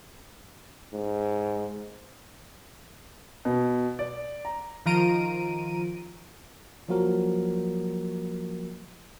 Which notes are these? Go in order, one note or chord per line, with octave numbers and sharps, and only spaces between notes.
G#2
B2
D5
A#5
D#3 F3 F4 A#5 D7 D#7
F3 F#3 A#3 F#4 A#4